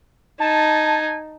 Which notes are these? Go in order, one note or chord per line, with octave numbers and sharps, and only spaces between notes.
D#4 G#5 A5